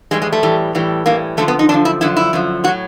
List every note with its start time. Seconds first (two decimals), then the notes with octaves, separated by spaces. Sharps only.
0.11 A2 E3 G3 G#3
0.22 G#3
0.32 A3
0.43 A2 E3 G3
0.75 A2 E3 G3
1.06 A2 E3 G3 A#3
1.37 F#2 D3 F3 A3
1.48 B3
1.59 D#4
1.69 F#2 D3 F3 D4
1.85 E4
2.01 F#2 D3 F3 E4
2.16 E4
2.33 F#2 D3 F3
2.64 A2 F#4
2.68 F#3